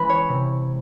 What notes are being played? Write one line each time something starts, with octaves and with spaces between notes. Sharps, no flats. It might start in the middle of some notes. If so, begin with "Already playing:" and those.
Already playing: E3 G#3 C#4 B4
C#5
C3